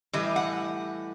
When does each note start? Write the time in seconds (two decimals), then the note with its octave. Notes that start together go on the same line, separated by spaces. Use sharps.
0.13 A2 E3 G3 D#5
0.36 F#5